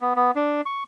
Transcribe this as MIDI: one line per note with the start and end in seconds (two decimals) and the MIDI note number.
0.01 0.13 59
0.16 0.31 59
0.36 0.61 62
0.66 0.83 85